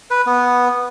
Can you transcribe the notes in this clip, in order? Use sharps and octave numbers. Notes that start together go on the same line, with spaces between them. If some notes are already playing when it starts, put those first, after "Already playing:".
B4
B3